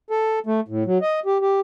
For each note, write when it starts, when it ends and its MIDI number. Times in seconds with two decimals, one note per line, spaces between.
0.10 0.39 69
0.46 0.60 57
0.68 0.84 45
0.86 0.98 54
1.01 1.20 75
1.26 1.38 67
1.41 1.60 67